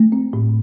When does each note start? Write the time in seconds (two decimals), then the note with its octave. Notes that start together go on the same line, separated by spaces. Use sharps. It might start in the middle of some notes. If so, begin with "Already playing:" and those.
Already playing: A3
0.12 C4
0.33 A2